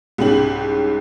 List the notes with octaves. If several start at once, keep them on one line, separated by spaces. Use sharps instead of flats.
C2 G#2 C#4 G4 F#7